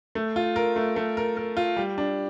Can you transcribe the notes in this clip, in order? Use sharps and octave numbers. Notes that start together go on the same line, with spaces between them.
A3
F4
A#4
A3
A3
A#4
A#4
F4
G3
D4